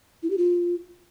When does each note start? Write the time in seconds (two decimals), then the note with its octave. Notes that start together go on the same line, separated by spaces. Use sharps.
0.23 E4
0.30 G4
0.38 F4